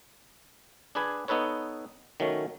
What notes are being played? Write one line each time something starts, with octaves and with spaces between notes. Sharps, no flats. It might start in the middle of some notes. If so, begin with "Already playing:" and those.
D4 G#4 B4 G#5
B3 D#4 A4 B4 C#5
D#3 F#3 A3 C#4